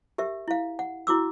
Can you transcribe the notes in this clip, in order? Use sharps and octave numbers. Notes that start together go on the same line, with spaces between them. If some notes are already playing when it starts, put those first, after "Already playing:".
G4 A#4 E5
E4 F5
F#5
E4 F#4 D6 E6